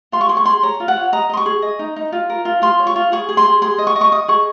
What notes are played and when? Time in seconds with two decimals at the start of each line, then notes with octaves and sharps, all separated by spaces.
0.12 F4 C6
0.21 C#6
0.29 G#4 C6
0.37 C#6
0.45 G#4 C6
0.63 C#5 A#5
0.80 F4
0.88 F#5
0.96 C#5
1.12 D#5 A#5
1.29 D#5 C6
1.37 C#6
1.46 G#4
1.62 D#5
1.79 D#4
1.96 D#4
2.12 F4
2.30 A#4
2.45 F4
2.62 F4 C6
2.79 C#5
2.87 C#6
2.96 F4
3.12 G#4 C#6
3.29 G#4
3.37 C6
3.46 G#4
3.62 G#4 C6
3.78 D#5
3.87 C#6
3.96 D#5
4.01 C#6
4.12 D#5 D#6
4.28 G#4 C#6